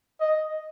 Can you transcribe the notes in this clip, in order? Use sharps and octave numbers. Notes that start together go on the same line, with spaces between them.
D#5